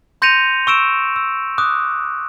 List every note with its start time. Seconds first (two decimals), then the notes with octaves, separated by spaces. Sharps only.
0.22 C6 G6 A#6 C#7 D#7 F7
0.67 C#6 E6 D7 E7
1.16 E6
1.58 D6 D#6 F#6